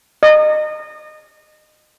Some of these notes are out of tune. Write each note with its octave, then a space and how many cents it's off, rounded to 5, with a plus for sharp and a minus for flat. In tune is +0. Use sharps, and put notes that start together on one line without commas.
D#5 -30